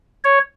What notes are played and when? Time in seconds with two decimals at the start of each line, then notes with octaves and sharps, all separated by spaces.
0.24 C#5